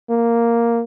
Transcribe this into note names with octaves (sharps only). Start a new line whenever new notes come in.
A#3